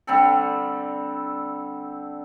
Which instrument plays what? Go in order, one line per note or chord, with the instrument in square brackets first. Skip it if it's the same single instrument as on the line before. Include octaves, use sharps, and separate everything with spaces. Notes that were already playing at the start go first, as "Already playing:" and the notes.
[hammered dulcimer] D3 G3 C4 A4